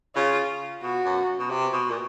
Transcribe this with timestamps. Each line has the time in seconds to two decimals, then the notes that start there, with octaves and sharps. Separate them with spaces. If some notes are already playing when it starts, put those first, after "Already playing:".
0.16 C#3 F4
0.82 B2 F#4
1.05 F#2
1.39 B2
1.50 C3
1.72 B2
1.90 A#2